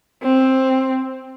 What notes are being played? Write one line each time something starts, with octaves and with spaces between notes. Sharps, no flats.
C4